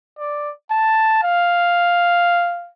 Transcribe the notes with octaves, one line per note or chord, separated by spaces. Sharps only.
D5
A5
F5